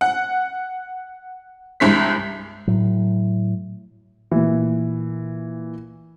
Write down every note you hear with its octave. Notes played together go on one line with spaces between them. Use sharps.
F#5
C2 G2 G#3 B6
A2 F#3
A#2 E3